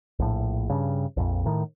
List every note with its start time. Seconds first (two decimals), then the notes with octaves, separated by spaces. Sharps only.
0.19 A#1 A2
0.70 G2 C#3
1.17 A#1 F2
1.46 A2 D#3